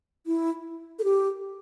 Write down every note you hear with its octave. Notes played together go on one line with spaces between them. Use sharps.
E4
A4
G4